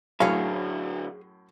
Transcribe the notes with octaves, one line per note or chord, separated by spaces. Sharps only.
F#2 A2 D3 F#3 G#4 C#5 F5